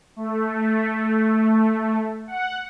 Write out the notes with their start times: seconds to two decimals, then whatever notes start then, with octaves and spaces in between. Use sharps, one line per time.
0.16 A3
2.27 F#5